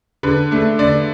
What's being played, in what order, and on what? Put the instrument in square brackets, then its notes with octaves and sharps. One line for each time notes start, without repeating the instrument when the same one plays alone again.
[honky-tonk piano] D3 B4
A3 D4
D3 D5